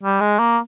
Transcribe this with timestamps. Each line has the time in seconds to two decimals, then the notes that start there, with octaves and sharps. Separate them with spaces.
0.03 G3
0.20 G#3
0.39 A#3